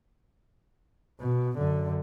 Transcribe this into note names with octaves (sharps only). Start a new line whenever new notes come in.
B2
F#2 D3